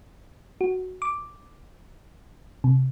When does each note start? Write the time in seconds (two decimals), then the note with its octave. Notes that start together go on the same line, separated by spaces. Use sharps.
0.61 F#4
1.02 D6
2.64 C3